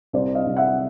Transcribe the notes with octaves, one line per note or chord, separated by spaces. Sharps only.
C2 C5 D5
D#5 F5
C2
E5 F#5